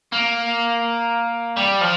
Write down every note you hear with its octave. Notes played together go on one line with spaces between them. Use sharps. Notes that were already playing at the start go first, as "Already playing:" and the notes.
A#3
G3
F3